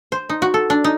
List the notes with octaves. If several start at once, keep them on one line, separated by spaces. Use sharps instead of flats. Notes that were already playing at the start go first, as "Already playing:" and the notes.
C5
D#4
F#4
A4
D4
D#4